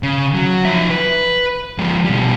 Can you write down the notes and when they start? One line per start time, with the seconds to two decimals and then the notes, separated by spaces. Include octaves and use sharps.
0.03 C#3
0.35 F#3
0.65 F3 E5
0.90 B4
1.79 F3 G#3
2.05 B2 G3